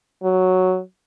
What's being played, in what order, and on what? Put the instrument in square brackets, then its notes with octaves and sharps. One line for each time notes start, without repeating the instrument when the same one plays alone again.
[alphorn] F#3